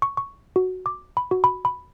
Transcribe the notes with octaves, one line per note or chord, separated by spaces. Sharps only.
C#6
C#6
F#4
D6
B5
F#4
B5
B5